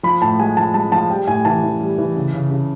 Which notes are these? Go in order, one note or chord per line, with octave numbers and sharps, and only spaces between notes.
F3 B5
A2 A5
G#3 G#5
F3 A5
G#3 A5
F3 A5
G3 G5
A2 G#5
E3 A5
E3
G3
E3
C#3
C#3
C#3